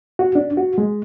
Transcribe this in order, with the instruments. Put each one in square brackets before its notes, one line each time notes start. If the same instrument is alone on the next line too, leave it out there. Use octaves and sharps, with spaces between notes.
[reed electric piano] F#4
D4
F#4
G#3